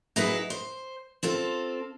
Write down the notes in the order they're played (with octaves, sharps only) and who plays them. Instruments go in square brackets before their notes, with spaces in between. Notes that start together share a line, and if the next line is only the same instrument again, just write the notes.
[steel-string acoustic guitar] F#3 D#4 E4 G#4 B4
C5
C4 F4 A4